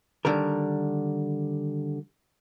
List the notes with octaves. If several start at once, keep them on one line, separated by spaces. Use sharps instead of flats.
D3 D#3 G3 A#4